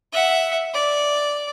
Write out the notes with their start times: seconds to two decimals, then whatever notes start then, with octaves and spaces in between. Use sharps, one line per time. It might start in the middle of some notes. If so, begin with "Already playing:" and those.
0.13 E5 F#5
0.74 D5